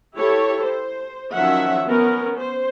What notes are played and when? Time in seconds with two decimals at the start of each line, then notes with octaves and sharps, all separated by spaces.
0.17 E4 G4 A4 C#5
0.64 C5
1.33 D#3 F3 F#3 C#4 E5 F#5
1.86 B3 C#4 A#4
2.38 C5